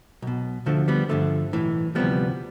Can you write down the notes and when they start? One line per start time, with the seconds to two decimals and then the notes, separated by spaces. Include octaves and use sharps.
0.22 B1 B2
0.66 D2 D3 F3 A3
0.88 G3 B3
1.09 G2 D3 F3 A3
1.53 B1 A2 E3
1.95 D2 C3 F3 G3 B3